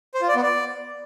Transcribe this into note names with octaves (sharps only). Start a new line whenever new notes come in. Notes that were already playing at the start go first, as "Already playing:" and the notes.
C5
F4
D5
B3
D5